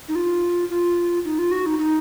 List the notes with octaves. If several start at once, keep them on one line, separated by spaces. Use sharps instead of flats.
D#4
F4
F4
D#4
F4
F#4
D#4
D#4